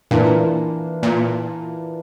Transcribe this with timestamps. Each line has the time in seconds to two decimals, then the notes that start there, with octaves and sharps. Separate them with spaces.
0.11 A#2 E3 A#3 D4 F4
1.03 A#2